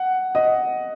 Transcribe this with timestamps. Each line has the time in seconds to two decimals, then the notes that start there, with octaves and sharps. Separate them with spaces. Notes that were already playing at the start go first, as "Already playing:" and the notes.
Already playing: F#5
0.35 D#5